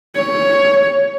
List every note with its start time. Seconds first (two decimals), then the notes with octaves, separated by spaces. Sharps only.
0.16 C#5